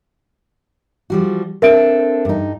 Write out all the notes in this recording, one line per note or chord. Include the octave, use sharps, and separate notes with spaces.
F3 G3 F#4
C4 D4 A4 A#4 E5 D7
G2 D#4